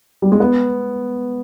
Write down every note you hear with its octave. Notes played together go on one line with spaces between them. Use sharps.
G3
G#3
B3